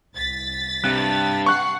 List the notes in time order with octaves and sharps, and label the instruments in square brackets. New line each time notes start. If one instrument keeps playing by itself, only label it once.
[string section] C2 A6 B6
[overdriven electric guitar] G2 [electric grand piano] C3 F#6
[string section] F#5 C7 [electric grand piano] C#6 F#6